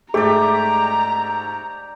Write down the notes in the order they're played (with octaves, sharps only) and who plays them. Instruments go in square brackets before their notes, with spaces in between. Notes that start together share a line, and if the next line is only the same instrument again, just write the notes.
[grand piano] G#2 A3 [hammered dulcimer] G4 D5 [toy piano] G#4 [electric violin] A#5